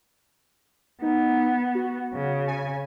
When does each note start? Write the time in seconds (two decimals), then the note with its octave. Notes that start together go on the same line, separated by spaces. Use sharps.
1.02 B3 D#4
1.75 F#4
2.13 C#3
2.47 G#5